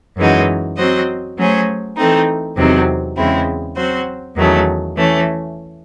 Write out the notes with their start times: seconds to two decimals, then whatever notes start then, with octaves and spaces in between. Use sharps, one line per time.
0.17 F#2 E3 G#3 D#4 F#4
0.77 F#3 C4 F#4 C5 D#5
1.38 F#3 A3 C#4 G#4 C5
1.97 E3 A3 C4 D#4
2.57 E2 C3 D#3 F#3 C4
3.17 E2 C#3 G#3 C4 E4
3.76 F#3 C4 F#4 C5
4.36 E2 D#3 F#3 A3 C#4
4.97 E3 A3 C#4